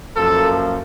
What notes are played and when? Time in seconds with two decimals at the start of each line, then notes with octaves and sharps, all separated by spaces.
0.15 F#2 F3 A#3 A4